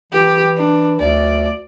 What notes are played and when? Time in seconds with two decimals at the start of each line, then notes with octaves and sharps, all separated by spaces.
0.12 E3 G4
0.57 D4
1.00 D2 D5